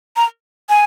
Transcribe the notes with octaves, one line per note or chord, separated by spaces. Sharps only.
A#5
G#5